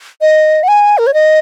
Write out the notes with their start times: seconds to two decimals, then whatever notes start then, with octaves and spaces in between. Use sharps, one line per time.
0.21 D#5
0.63 F#5
0.68 G#5
0.98 A#4
1.07 C#5
1.14 D#5